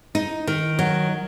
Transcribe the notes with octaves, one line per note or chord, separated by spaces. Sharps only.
D#4
D#3
F#3